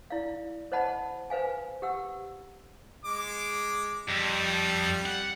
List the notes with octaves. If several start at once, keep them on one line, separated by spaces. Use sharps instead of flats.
E4 D5 F5
C5 C#5 D#5 F#5 A5 B5
B4 C5 F5 G#5
G4 F#5 E6
G#3 D6
F2 G3
F#5